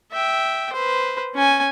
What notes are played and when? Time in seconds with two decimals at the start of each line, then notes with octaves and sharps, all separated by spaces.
0.12 E5 G5
0.73 B4 C5
1.35 C#4 G#5